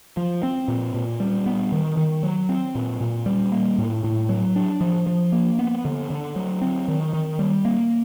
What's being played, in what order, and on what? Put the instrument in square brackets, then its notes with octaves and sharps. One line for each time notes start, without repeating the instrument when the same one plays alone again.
[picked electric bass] F3
C4
A#2
A#2
G3
B3
D#3
D#3
F#3
C4
A#2
A#2
G3
A#3
A2
A2
F#3
D4
F3
F3
A#3
B3
D3
D3
F#3
C4
D#3
D#3
G3
A#3